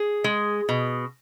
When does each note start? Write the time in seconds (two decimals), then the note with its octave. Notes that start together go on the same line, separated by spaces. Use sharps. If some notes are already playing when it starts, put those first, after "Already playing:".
Already playing: G#4
0.24 G#3
0.69 B2